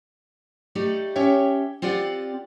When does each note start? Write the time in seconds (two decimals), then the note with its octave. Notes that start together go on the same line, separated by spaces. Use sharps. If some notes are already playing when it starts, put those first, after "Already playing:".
0.75 A3 D#4 G4 D5
1.15 C#4 G4 C#5 E5 G5
1.82 C4 F4 G4 D5 F#5